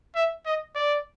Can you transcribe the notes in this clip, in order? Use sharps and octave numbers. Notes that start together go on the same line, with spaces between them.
E5
D#5
D5